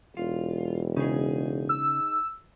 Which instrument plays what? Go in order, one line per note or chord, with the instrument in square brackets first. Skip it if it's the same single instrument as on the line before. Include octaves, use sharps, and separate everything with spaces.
[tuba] E1 [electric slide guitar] F4
[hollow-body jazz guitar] C#3 [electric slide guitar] D#4 G#4
[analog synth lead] E6